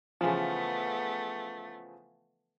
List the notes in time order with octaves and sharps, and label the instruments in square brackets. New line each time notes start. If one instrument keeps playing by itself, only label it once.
[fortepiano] C#3 E3 F3 [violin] A3 B3